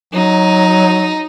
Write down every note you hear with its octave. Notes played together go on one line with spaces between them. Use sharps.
F#3 D#4